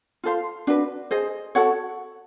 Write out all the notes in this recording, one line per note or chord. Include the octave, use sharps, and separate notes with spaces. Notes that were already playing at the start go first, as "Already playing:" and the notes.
F4 A4 C5 F5
D4 F#4 B4
G#4 C5 D#5
F#4 A4 C#5 F#5